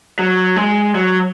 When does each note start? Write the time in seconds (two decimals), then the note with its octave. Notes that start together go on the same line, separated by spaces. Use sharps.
0.19 F#3
0.56 G#3
0.95 F#3